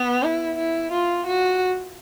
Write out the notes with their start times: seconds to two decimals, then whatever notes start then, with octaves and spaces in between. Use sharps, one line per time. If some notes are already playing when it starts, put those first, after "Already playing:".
Already playing: B3
0.23 E4
0.58 E4
0.92 F4
1.26 F#4